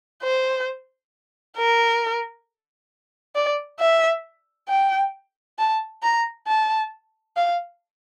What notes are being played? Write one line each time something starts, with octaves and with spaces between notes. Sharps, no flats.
C5
A#4
D5
E5
G5
A5
A#5
A5
F5